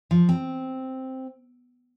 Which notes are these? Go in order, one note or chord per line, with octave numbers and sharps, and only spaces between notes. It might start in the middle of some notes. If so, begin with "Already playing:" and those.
F3
C4